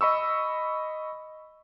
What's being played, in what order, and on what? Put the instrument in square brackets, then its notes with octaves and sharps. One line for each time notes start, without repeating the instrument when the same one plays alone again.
[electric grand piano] D#5 B5 C#6 E6